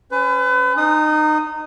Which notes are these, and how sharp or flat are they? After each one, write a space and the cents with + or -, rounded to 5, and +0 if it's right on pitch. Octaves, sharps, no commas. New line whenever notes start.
C#4 -5 B4 +35
D#4 -25 D#6 +0